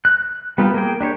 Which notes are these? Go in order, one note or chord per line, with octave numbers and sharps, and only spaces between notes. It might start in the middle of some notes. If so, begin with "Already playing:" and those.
F#6
G3 A#3 B3 F4 G4
A#3 G#4 G5
D4 G4 C5 C#5